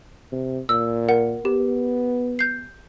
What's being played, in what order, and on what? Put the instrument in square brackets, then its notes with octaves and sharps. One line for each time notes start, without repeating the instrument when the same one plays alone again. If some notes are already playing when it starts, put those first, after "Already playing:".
[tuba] C3
[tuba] A#2 [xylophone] E6
[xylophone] A#4 F#5
[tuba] B3 [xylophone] G4
[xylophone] G6 C7